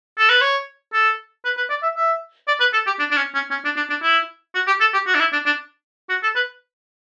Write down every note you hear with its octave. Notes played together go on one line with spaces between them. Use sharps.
A4
B4
C#5
A4
B4
B4
D5
E5
E5
D5
B4
A4
G4
D4
D4
C#4
C#4
C#4
D4
D4
D4
E4
F#4
G4
A4
G4
F#4
D4
E4
D4
D4
F#4
A4
B4